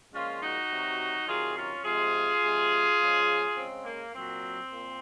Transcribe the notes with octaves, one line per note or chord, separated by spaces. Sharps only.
A#2 F3 G#3 C#4 F4
D#4 F#4
C3 F#3
C3 D#3 F#3 F4 G#4
C#4 F4
C3 F3 G#3 F4 G#4
C3 F3 G#3
C#3 F3 G#3
C#3 G#3 C4
A#3
A#2 F#3 C4
A#2